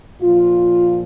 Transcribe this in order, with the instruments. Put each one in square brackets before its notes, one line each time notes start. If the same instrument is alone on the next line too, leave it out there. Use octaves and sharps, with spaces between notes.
[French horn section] A#2 F3 F4